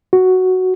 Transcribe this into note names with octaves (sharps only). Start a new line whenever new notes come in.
F#4